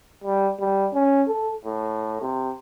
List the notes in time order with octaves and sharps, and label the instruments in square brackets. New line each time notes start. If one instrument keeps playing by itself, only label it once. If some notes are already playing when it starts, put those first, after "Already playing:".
[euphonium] G3
G3
C#4
A4
A2
C3